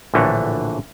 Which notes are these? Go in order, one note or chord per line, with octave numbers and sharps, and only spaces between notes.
A#1 A2 D3 E3 A3